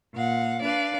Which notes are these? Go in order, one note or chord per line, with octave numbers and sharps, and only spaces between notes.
A#2 F5 F#5
D4 B4 D5 F5